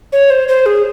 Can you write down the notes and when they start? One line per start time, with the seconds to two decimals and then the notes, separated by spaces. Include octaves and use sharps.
0.13 C#5
0.30 C5
0.48 C5
0.66 G#4